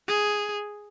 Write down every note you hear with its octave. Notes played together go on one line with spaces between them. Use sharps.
G#4